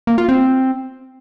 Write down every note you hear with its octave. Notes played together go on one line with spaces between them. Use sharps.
A#3
F4
C4